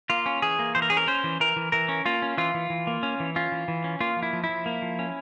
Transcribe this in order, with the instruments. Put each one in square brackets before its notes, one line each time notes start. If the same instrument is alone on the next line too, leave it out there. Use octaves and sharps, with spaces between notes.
[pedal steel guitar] A#3 F4
C#4
E3 G#4
A#3
E3 C5
A#4
C#4 G#4
A#4
C#4 C5
E3
E3 A#4
E3
E3 A#4
C#4
A#3 F4
C#4
E3 F4
E3
E3
A#3
C#4
E3
C#4 F4
E3
E3
C#4
A#3 F4
F3
E4
F3
E4
F3
A#3
F3
C#4